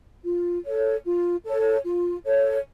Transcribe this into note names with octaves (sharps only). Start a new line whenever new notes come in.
F4
A4 C#5
F4
A4 C#5
F4
A4 C#5